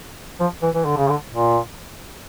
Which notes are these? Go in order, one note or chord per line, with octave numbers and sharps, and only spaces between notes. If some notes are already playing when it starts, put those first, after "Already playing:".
F3
E3
E3
D3
C#3
D3
A#2